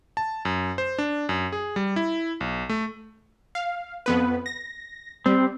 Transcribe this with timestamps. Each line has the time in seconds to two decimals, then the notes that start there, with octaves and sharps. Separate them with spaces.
0.17 A5
0.45 F#2
0.78 C5
0.98 D4
1.29 F#2
1.52 G#4
1.76 G3
1.96 E4
2.41 B1
2.69 A3
3.55 F5
4.06 F2 B3 B4
4.46 A#6
5.26 G3 C4